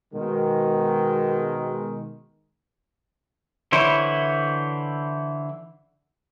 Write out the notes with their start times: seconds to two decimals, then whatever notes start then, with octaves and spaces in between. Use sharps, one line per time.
0.14 B2 D#3 G#3
3.72 D3 E3 E4 C5 C#5